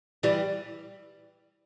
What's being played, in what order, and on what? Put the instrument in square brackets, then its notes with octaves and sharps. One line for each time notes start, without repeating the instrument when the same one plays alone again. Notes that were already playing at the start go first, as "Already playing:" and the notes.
[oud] E3 G3